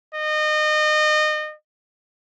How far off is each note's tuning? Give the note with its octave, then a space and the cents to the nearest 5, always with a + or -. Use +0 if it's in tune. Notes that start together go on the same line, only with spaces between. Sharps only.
D#5 -30